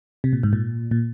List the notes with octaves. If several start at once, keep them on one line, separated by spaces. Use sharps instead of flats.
C3
A#2
G#2
A#2
A#2